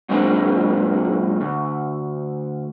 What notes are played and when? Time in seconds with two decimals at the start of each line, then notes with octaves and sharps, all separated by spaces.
0.09 F#2 A#2 G#3 C4 D4
1.41 D2